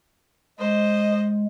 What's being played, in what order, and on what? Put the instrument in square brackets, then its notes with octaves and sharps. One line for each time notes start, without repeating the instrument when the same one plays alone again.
[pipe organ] G#3 [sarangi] C5 [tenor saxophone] D#5